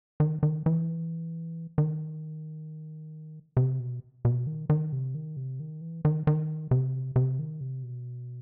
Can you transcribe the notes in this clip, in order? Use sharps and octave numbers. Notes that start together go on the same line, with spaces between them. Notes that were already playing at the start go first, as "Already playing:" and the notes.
D#3
D#3
E3
D#3
C3
B2
B2
D#3
D#3
C3
D#3
C3
D#3
E3
D#3
D#3
C3
C3
D#3
C3
B2